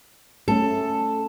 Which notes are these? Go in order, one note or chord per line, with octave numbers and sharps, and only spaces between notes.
A3 C#4 A4